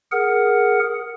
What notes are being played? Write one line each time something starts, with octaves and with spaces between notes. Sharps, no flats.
G#4 A#4 F#5